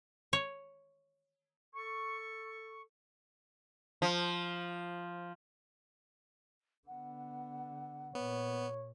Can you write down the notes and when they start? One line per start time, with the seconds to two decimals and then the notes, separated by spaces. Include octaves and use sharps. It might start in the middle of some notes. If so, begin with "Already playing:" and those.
0.33 C#5
1.76 A4 C#6
4.02 F3
6.88 D3 B3 F#5
8.15 A#2 B3 C#5